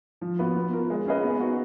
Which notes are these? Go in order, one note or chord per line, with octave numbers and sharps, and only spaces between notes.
F3
B3 F#4 B4
B3
F4 A#4
G#3
C#4 G#4 B4 D#5
B3
D#4 F#4